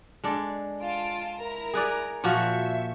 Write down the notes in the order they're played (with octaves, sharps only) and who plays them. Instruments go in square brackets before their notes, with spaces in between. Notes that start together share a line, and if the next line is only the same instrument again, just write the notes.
[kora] G#3 D4 A4
[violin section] F4 A5 D7
E4 A#4 A#5
[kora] G#4 B4 D5
[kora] A#2 F3 F#4 [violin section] E5 C#6